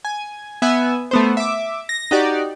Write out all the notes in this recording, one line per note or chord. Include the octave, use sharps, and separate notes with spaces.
G#5
B3 E5 G#5
A3 B3 C5
E5 D6
A#6
D#4 F#4 G4 D5